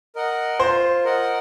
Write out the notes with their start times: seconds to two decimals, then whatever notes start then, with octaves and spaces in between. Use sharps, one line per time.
0.16 A#4 D#5 F#5
0.60 F4 C5
1.04 A#4 D#5 F#5